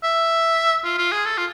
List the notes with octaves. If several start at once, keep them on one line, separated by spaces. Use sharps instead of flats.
E5
F4
F4
G#4
A4
F4